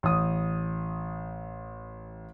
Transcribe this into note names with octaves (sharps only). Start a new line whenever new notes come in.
A1 D#6